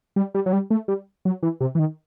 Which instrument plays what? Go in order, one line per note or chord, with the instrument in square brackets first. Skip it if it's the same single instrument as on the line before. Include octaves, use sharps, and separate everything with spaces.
[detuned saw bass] G3
G3
F#3
G3
A3
G3
F#3
E3
C3
E3
D#3